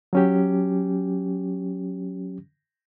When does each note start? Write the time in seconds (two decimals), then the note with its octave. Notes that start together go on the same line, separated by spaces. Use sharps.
0.13 F#3 C#4 G4